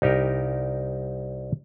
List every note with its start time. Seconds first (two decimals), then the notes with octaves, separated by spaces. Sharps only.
0.02 C2 D#4 G4 A#4